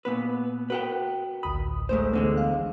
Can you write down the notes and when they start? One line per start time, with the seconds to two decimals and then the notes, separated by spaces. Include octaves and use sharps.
0.05 A#2 B3 B4
0.70 F#4 A#4 B4 F#5 G5
1.43 A1 D2 B5 D#6
1.89 G#2 A3 C5
2.13 E2 D3 G#3 A3
2.37 F5